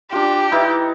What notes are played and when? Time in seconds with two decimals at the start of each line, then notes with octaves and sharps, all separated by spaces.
0.12 D4 F4 G4
0.51 E3 D#4 E4